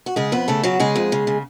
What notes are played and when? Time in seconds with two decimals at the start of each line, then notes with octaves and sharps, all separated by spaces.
0.06 F#4
0.16 C#3 G#3 G#4
0.32 F2 B3 B4
0.48 C#3 A3 A4
0.63 C#3 F#3 F#4
0.80 C#3 G#3 G#4
0.96 F2
1.12 C#3
1.27 C#3